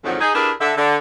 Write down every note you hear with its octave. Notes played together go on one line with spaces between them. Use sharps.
F2 G#2 D3 D#3 F3 F#3
D#4 G#4
D4 E4 G4 G#4 A#4 B4
D3 E5
D3